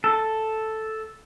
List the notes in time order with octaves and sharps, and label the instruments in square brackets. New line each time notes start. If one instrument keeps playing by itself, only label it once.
[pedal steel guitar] A4